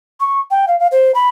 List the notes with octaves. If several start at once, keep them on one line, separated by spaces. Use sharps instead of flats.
C#6
G5
F5
F5
C5
B5